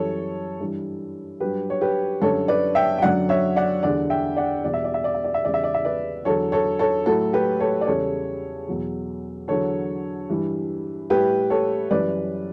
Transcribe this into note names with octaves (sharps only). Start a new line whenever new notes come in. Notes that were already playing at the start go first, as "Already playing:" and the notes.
Already playing: F#2 E3 G3 A4 C#5
G2 E3 G3
G2 F#3 G4 B4
C#5
G4 B4
F#2 D3 G3 A4 C#5
B4 D5
E5 G5
G5
F#2 D3 F#3 D5 F#5
C#5 E5
D5 F#5
E2 D3 G3 D5 F#5
E5 G5
D5 F#5
E2 B2 G3 D5
E5
D5
E5
D5
E5
D5
E5
E2 C#3 G3 D5
E5
D5
E5
B4 D5
E2 D3 F#3 A4 C#5
A4 C#5
A4 C#5
A2 F#3 F#4 A4
G4 B4
A4 C#5
D5
E2 C#3 G3 A4 C#5
E2 B2 F#3
E2 D3 F#3 A4 C#5
G2 E3 G3
A2 G3 G4 B4
A4 C#5
F#2 E3 G3 B4 D5